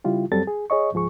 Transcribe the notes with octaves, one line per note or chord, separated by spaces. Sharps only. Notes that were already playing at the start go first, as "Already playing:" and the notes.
C#3 G3 E4 F4 G4
F#2 F#3 G3 C4 A4 A6
G#4
G#4 C#5 D#5 C#6
C#2 G#2 F3 G#4 C#6